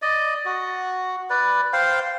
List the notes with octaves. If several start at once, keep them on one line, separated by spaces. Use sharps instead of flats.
D5 D#5
F#4
B4 D5
C5 F5 G5